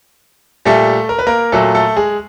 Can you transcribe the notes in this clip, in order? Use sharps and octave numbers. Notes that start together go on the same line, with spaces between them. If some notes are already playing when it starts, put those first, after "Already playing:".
A#2 G3 A3 A4
A#4
B4
A#3 A#4
A#2 F#3 A3 A4
A3 A4
G#3 G#4